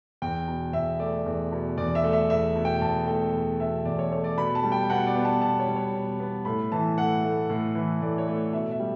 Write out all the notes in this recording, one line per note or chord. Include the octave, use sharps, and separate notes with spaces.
E2 G5
B2
E2 E5
A3 D5
E2
B2
E2 D5
E5
A3
E5
E2 E5
B2
G5
E2 A5
A3 G5
E2
B2 E5
E2 D5
C#5
A3 C#5
D5
B2 B5
A5
G3
G5
B2 F#5
D5
B3
A5
B2 A5
C#5
G3
C#5
B2
B3
A2 B5
E3 A5
A2 F#5
A3
A2
E3
A2 D5
C#5
A3
B2 E5
E5
G3